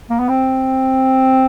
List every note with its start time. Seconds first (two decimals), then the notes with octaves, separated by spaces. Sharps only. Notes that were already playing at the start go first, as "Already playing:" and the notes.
0.10 A#3
0.19 B3
0.29 C4